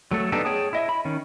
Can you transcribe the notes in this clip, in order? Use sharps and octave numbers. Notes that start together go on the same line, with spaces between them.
F#3 A3 A4
B3 D4 D#4 G4 A4
G#4 C#5 G5 A5 D#6
E4 D#5 E5
B5
D#3 C#4